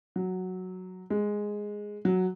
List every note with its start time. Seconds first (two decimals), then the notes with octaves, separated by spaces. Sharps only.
0.16 F#3
1.10 G#3
2.05 F#3